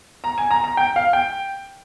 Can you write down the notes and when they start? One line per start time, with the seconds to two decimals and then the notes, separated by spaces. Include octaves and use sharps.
0.24 A#5
0.38 G#5
0.51 A#5
0.64 A#5
0.77 G5
0.96 F5
1.13 G5